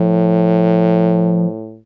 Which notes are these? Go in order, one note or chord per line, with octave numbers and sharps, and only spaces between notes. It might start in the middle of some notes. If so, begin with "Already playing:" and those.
Already playing: A2 F3